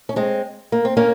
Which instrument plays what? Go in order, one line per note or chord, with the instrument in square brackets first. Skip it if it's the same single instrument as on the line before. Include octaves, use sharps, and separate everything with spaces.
[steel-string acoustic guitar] C#4
G#3 C4
A#3
C4
A#3 C#4